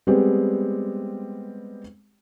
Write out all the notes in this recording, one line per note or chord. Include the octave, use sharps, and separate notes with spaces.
G3 G#3 B3 C4 G4